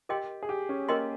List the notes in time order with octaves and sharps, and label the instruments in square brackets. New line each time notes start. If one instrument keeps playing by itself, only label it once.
[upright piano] G4 [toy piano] A#4 D#5 G5 C6
[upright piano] G#4
G4
C#4
[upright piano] A#3 [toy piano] A#4 D#5 G5 C6